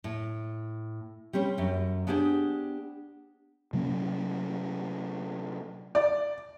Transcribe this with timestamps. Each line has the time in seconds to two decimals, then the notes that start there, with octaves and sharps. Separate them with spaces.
0.04 A2
1.33 G3 C4 C#4 B4
1.57 F#2 A3
2.07 B3 D4 G4 G#4 C5
3.73 C3 F#3 A#3 C#4
5.95 D5